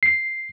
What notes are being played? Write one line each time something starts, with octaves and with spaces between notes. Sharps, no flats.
C7